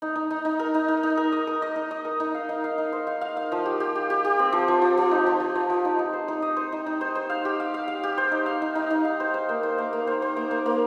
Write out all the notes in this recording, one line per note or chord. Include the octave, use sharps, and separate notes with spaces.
D#4
D#4
D#4
D#4
A#4
D#4
D#4
D#4
A#4
D#5
A#4
D#5
D#4
D#5
A#4
D#4
F5
D#4
F5
D#4
C5
F5
F5
F5
F3
G4
G4
G4
G4
G4
C4
F3
F3
F3
F3
D#4
F3
F3
F3
F3
D#4
D#4
C5
D#4
D#5
C5
D#4
D#4
C5
C5
F5
G4
F5
F5
F5
G4
C5
D#4
F5
D#4
D#4
D#4
F5
C5
C5
A#3
C5
A#3
A#3
C5
C5
A#3
A#3
A#3